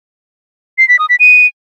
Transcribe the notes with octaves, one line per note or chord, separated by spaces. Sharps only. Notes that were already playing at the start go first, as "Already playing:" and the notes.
C7
B6
D#6
B6
D#7